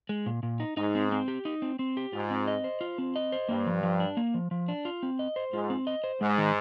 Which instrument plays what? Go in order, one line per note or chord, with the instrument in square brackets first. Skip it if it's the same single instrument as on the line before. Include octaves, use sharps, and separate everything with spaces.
[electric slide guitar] G#3
A#2
A#2
D#4
[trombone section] G#2 [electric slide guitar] D#4
[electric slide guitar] C4
C4
G4
D#4
C4
C4
G4
[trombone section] G#2 [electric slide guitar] F4
[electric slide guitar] C4
D#5
C5
F4
C4
D#5
C5
[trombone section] G2 [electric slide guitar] A#3
[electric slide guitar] F3
F3
D4
A#3
F3
F3
D4
F4
C4
D#5
C5
[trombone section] G#2 [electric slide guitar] F4
[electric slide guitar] C4
D#5
C5
[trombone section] G#2 [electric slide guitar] G#3
[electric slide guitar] D#3